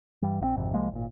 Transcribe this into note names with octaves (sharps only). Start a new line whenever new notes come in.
G2 E3 G3
A#1 D#3 C4
G#1 F2 C3
C2 F3 G#3 A#3
G#1 A#2